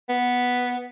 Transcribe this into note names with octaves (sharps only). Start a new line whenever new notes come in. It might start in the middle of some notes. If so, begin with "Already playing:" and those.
B3